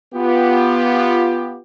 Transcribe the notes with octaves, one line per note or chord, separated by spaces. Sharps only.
B3 F4 G4